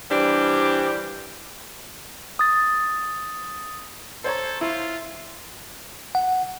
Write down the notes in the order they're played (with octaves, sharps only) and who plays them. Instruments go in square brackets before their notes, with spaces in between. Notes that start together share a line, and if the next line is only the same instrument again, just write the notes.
[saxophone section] E3 G3 D4 G4 C5
[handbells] D#6 A6
[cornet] A4 [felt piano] C5 C#5 A#5
[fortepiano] E4 [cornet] F4
[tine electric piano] F#5